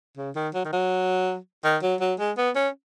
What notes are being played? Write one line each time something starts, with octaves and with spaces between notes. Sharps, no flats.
C#3
D#3
F#3
D#3
F#3
D#3
F#3
F#3
G#3
B3
C#4